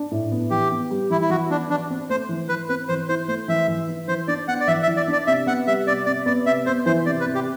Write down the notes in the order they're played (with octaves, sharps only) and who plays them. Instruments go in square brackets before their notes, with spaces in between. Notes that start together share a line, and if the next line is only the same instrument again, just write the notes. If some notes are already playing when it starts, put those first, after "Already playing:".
Already playing: [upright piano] D4
A2
B3
[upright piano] E3 [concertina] G4
[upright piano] B3
G3
[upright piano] E3 [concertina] E4
[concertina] E4
[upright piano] E3 [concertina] F#4
[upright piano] B3 [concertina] D4
[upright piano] E3 [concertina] D4
[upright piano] C4
[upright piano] A3 [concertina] C5
[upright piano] E3
[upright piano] E3 [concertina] B4
[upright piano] C4 [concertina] B4
[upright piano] E3 [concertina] C5
[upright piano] E4 [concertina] C5
[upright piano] A3 [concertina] C5
[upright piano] E3 [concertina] E5
[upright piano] E3
E4
[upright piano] E3 [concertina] C5
[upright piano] D4 [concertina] D5
[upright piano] B3 [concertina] F#5
[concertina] D5
[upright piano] E3 [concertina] E5
[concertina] E5
[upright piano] E3
[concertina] D5
[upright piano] D4 [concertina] D5
[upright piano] C3 [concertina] E5
[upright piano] B3 [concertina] F#5
[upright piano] G3 [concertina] E5
[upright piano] C3 [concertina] D5
[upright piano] C3 [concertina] D5
[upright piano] B3 [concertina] D5
[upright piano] C3 [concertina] E5
[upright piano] B3 [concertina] C5
[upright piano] E3 [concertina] C5
[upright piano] C3 [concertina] D5
[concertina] B4
[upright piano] C3
[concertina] G4